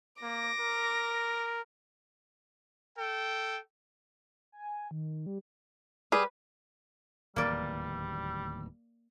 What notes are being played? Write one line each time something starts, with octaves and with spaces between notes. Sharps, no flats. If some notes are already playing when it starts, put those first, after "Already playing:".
A#3 D6 A#6
A#4
A4 G5
G#5
D#3
G3
G3 G#4 B4
D1 D#2 E3 G3 A#3 D5